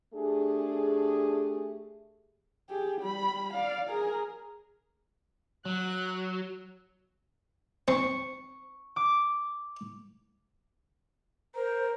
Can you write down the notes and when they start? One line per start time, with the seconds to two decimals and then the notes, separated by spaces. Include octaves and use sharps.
0.14 A3 D4 G4 G#4
2.70 G4 G#4
3.01 G3 B5
3.54 D5 F5
3.89 G#4 A#4
5.65 F#3 F#6
7.88 C4 C#6
8.96 D6
11.55 A#4 C5